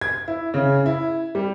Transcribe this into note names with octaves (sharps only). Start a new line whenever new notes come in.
G#6
E4
C#3
E4
G3